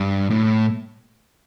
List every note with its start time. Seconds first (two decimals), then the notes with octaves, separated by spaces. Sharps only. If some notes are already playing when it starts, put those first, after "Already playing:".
Already playing: G2
0.31 A2